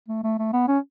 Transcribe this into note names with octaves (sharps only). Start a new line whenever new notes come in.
A3
A3
A3
B3
C#4